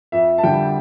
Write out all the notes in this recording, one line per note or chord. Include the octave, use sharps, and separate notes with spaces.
F2 E5
A5
D3 G3 G5